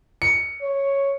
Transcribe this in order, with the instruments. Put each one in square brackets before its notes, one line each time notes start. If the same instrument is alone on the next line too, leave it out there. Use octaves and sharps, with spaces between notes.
[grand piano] C#7
[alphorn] C#5